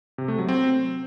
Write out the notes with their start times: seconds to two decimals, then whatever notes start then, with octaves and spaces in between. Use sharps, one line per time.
0.18 C3
0.28 A3
0.38 F#3
0.48 C4